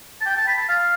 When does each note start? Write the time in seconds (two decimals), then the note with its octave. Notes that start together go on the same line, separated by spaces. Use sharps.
0.21 A5
0.26 G5
0.37 A5
0.48 B5
0.58 A5
0.69 F5